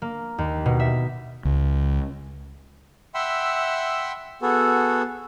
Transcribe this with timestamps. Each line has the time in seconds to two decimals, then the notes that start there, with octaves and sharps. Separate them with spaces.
0.02 A#3
0.38 D#2
0.66 B2
0.80 E5
1.45 C#2
3.14 E5 F#5 G5 B5 C6 E6
4.42 B3 F#4 G#4 A4